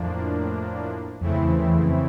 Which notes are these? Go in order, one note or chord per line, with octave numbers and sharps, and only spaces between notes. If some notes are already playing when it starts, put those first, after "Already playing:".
Already playing: F2 A2 F3 A#3 D4
F2 C#3 E3 A3 C4 E4
E2
E2
F2